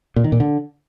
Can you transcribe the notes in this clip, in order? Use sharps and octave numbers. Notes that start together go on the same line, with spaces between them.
A#2
D#3
A#2
D3